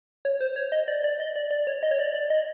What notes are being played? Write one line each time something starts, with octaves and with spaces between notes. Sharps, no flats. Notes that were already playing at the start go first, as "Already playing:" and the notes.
C#5
C5
C#5
D#5
D5
D5
D#5
D5
D5
C#5
D#5
C#5
D5
D5
D#5